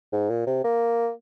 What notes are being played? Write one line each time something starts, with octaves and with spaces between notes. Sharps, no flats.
G#2
A#2
C3
A#3